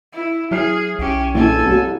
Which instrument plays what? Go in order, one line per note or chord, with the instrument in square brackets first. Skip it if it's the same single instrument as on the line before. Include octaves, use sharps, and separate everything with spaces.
[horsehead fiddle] E4
[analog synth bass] F#3 [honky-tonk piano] E4 F6 C7 [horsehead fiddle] G#4
[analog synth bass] B1 [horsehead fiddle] C#4 G4
[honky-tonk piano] A#1 F#2 E3 [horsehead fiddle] A4 G#5
[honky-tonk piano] C2 F#3